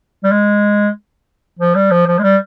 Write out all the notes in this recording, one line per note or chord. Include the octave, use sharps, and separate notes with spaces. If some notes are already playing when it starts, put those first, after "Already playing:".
G3
G#3
F3
G3
F3
F3
G#3
G3